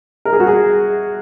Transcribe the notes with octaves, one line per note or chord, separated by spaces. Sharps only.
A#4
G#4
F#4
G#4